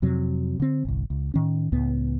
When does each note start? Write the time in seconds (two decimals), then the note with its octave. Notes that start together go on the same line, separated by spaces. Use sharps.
0.02 F2 C3 F#3
0.60 D3 C4
0.85 G1 C2
1.10 C#2
1.34 A2 D#3 C#4
1.72 C#2 A2 B3